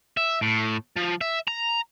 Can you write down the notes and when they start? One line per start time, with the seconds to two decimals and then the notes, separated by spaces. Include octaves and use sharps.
0.17 E5
0.42 A2
0.96 F3
1.21 E5
1.48 A#5